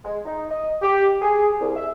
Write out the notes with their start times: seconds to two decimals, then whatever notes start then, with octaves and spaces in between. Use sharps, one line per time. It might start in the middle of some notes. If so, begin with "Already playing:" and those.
0.05 G#3
0.25 D#4
0.50 D#5
0.82 G4
1.22 G#4
1.60 C2
1.76 E5